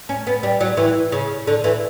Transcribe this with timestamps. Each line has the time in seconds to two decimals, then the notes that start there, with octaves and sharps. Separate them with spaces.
0.09 C#4
0.27 B3
0.43 G3
0.61 F#3
0.77 E3
1.12 C#3
1.47 D3
1.64 E3